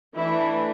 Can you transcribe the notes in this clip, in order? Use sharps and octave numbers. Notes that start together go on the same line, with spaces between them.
E3 A3 D4 E4